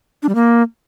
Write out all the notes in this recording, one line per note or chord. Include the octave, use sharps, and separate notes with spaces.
D4
G3
A#3